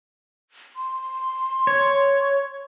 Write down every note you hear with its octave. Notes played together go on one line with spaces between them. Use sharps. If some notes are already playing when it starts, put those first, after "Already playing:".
C6
C#5